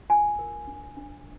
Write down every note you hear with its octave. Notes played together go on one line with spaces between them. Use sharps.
F4 G#5
A#4
D4
D4